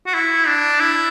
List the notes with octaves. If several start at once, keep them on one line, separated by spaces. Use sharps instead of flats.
F#4
E4
D4
E4